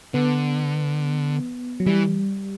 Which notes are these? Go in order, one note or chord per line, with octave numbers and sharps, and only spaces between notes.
D3 B3
F#3
E3 G3